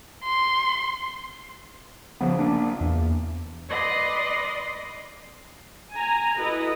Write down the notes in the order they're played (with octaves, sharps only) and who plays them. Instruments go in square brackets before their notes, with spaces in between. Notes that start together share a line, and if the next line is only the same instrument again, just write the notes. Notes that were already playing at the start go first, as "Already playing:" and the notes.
[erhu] C6
[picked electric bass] C#3 F3 B3
A#3 D4
E2
[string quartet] B4 D5 D#5 C6 A#6
[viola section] G#5 A#5
E4 F#4 A4 B4 D#5